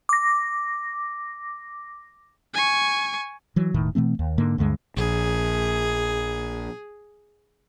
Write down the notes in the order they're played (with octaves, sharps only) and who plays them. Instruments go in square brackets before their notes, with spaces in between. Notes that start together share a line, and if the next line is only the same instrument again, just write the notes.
[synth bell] D6 A#6
[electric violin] G#5 C#6
[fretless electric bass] E3 F#3
E1 A2 D#3
B2 E3 A3 C4
D#2
G#2 D3 A#3
D2 G2 D3 G#3
[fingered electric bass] A#1 [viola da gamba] G#4